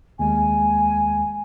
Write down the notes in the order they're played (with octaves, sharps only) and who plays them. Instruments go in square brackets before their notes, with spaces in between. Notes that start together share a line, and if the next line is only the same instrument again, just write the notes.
[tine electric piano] D#2 G#3 [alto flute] G#5